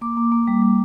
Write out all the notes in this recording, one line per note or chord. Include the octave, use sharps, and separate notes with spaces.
A#3 D6
A#3
A#3
G3
G3